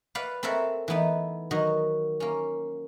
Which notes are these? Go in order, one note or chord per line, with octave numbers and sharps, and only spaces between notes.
B4 D5 F5 F#5
C4 A4 A#4 C#5 E5 F#5
E3 A3 B3 D#4
D#3 F#3 F#4 D#5
A#3 C#4